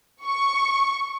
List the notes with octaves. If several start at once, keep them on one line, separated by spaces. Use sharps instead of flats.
C#6